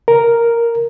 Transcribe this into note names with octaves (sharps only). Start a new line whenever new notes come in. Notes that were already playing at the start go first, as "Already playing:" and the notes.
A#4